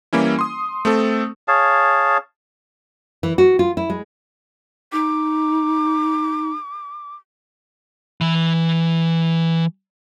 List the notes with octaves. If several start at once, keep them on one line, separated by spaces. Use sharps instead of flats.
E3 G3 A#3 C#4 E4
C6 D#6
A3 C4 A4
G#4 C#5 F5 A5
E3
F#4
F4
E4
G#3
D#4 D6
E3 B5